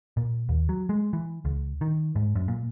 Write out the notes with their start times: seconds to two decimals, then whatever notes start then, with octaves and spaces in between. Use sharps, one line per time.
0.17 A#2
0.49 D#2
0.69 F#3
0.89 G#3
1.13 E3
1.45 C#2
1.81 D#3
2.16 G#2
2.35 F#2
2.48 A#2